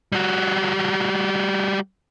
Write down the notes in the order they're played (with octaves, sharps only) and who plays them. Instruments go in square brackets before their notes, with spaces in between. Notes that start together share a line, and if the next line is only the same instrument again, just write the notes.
[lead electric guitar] G3 F#4